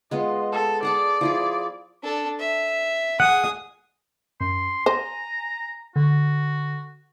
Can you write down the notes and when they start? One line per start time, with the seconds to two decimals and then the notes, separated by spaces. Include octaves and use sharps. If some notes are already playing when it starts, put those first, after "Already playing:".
0.11 G#3 B3 F4 D#5
0.52 A4
0.83 G#4 D5 F#5 A5
1.21 F3 E4 G#4
2.03 D4 A4
2.39 E5
3.20 G#4 F#5 D#6
4.41 F#2 C6
4.86 C5 G#5 A#5
5.96 D3 F#4